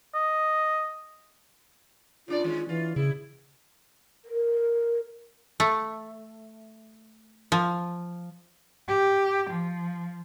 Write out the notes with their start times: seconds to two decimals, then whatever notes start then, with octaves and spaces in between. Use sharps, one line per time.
0.14 D#5
2.28 C#3 D4 F4 D5
2.44 D#3 G#3 C#4
2.69 E3 F4
2.96 C#3 E4 G#4
4.24 A#4
5.60 A3
7.52 F3
8.88 G4
9.50 F3